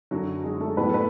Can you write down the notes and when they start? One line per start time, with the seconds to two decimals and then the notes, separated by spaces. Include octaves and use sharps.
0.11 F#2 D3 F#3 F#4
0.44 G#3 G#4
0.60 A3 A4
0.77 A2 F#3 B3 B4
0.89 A4
0.94 B3 B4